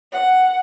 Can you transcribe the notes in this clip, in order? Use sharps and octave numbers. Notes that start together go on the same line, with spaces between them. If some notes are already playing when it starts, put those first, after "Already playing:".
F#5